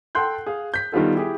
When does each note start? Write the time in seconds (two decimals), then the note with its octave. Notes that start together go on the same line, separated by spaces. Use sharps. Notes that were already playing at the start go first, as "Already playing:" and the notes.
0.15 A4 F#5 G5 C6 F#6 G6
0.46 G#4 F5
0.74 G6 B6
0.92 D#3 G3 B3 F4 A4
1.15 E4 G4 G#4